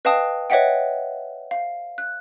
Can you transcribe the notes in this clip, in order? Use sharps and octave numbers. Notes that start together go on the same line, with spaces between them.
B4 D#5 F5 G5 A5 D#6
B4 C#5 D#5 E5 F#5 G5
F5
F#6